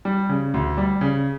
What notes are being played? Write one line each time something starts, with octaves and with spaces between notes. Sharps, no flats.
G3
C#3
D2
G3
C#3